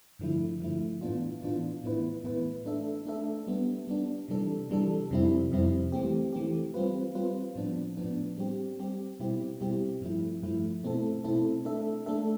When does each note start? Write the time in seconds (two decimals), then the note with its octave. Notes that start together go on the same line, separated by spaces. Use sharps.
0.19 G2 D3 F3 A3 E4
0.60 G2 D3 F3 A3 E4
1.01 A2 E3 B3 D4 F4
1.42 A2 E3 B3 D4 F4
1.83 A2 E3 B3 E4 B4
2.24 A2 E3 B3 E4 B4
2.65 A3 D4 A4 E5
3.06 A3 D4 A4 E5
3.47 G3 B3 D4
3.87 G3 B3 D4
4.29 C3 E3 G3 D4 A4
4.70 C3 E3 G3 D4 A4
5.11 F2 C3 G3 C4 E4
5.52 F2 C3 G3 C4 E4
5.92 E3 A3 C4 G4
6.33 E3 A3 C4 G4
6.74 G3 C4 F4 B4
7.14 G3 C4 F4 B4
7.55 A2 F3 B3 D4
7.97 A2 F3 B3 D4
8.38 G3 C4 G4
8.79 G3 C4 G4
9.20 B2 G3 C4 E4 G4
9.61 B2 G3 C4 E4 G4
10.01 G2 F3 A3 E4
10.42 G2 F3 A3 E4
10.83 B2 A3 C4 E4 A4
11.24 B2 A3 C4 E4 A4
11.65 A3 D4 A4 E5
12.06 A3 D4 A4 E5